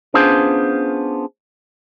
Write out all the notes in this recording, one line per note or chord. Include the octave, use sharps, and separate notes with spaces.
B3 C#4 D4 F4 G#4 C5